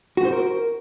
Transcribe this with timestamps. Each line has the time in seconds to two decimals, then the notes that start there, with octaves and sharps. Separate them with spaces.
0.17 F#4
0.25 C5
0.33 A#4